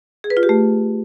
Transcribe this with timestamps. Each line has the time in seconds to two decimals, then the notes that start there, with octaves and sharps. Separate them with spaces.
0.24 G#4
0.30 B4
0.37 F4
0.43 G4
0.49 A3